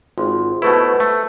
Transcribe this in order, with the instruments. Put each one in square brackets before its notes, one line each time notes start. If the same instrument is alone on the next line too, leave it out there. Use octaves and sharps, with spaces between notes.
[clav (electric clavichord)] G#1 [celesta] F4 G#4 C6
[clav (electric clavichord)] B2 A3 E4 [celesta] B4 C5 C#6
[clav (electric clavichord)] A3